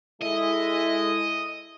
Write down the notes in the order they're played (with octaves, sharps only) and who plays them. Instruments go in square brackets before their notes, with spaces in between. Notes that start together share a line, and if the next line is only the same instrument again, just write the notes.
[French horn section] G#3 E4 A4 [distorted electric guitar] D#5